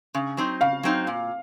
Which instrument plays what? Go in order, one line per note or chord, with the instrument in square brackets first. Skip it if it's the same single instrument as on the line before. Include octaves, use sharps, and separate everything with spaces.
[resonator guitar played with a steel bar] C#3
F#3 C4 D#4
[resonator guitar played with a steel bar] C#3 [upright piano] F5
[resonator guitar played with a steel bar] F#3 C4 D#4
A#2